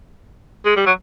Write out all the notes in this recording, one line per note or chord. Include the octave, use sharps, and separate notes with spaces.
G#3
G3
F#3